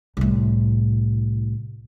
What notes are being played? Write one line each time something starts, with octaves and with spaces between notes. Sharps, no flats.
C2 A2